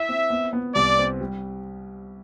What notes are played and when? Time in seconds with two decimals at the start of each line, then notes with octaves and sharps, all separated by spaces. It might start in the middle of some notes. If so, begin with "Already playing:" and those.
Already playing: E4 E5
0.09 C4
0.30 B3
0.53 B3
0.75 C2 D5
0.98 C4
1.21 G3